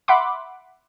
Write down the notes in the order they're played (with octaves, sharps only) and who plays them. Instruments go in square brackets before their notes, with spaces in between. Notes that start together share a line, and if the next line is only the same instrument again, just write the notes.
[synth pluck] E5 F#5 B5 C6 D6